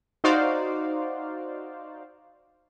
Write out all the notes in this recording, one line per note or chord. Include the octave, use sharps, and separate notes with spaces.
D#4 F#4 C5 D5 F5